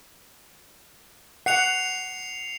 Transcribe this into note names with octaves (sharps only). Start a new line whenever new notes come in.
F#5 C7 C#7 F7